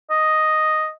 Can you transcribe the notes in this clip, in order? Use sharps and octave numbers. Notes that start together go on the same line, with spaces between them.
D#5